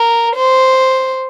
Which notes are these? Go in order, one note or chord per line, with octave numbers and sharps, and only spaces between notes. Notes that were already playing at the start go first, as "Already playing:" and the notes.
Already playing: A#4
C5